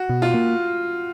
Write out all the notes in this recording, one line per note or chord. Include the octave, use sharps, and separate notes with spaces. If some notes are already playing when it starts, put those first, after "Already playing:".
Already playing: F#4
B2
F4
A#3